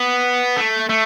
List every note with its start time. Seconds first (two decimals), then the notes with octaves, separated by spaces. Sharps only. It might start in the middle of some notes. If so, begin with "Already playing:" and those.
Already playing: B3
0.57 A3
0.90 A3